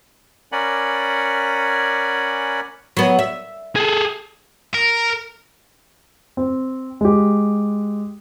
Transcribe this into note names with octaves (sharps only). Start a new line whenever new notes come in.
C#4 A#4 D5 F#5 G#5 B5
F#3 B3
E5
G#4 A4
A#4
C4
G#3 G4